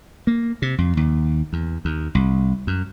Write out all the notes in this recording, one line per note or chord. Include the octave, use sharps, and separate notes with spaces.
A#3
C3
F2
D#2
E2
D#2
C2
F#2